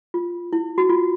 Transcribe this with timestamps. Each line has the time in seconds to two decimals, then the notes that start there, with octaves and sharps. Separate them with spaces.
0.14 F4
0.53 E4
0.78 F#4
0.89 F4